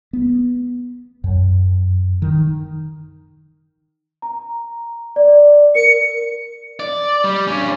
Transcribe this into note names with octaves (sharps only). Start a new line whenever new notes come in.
B3
F#2
D#3
A#5
D5
A#4 C#7
D5
G3
G2 C#4